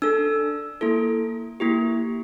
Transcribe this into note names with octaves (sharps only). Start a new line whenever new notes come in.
D4 A4 E6
A#3 E4 A4
A#3 E4 G4